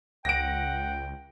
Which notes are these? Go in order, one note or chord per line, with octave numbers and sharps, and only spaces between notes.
C#2 F#5 G5 A#6 D7